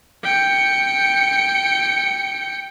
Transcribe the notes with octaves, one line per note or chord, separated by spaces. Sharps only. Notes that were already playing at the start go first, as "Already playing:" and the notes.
G5 C#7